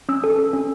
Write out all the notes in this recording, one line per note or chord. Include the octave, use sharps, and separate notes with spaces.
C#4 E6
A4
A4
C#4